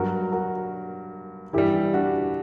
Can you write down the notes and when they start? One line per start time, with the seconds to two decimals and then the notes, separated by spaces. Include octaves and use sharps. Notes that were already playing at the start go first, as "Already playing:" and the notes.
Already playing: G2 F#3 F#4 A#4
0.32 F#4 A#4
1.53 G2 E3 G3 E4 G4
1.94 D4 F#4